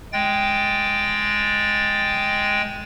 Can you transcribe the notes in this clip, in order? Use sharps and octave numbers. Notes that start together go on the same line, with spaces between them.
G#3 G5 A6